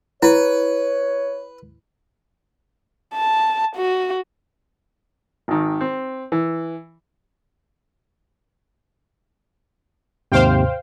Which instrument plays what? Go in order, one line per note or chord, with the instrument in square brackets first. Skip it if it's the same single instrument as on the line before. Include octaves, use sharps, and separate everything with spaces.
[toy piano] E4 [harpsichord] B4 [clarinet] C#5
[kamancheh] A5
F#4
[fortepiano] G#1 D#3
C4
E3
[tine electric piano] D#2 G#2 C3 [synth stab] C5 F5 G5